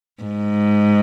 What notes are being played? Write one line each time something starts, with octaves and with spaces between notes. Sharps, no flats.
G#2